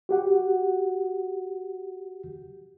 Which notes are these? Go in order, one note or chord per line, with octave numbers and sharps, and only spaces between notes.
F#4 G4 F#5